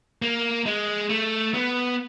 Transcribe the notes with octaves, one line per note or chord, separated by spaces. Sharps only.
A#3
G#3
A3
B3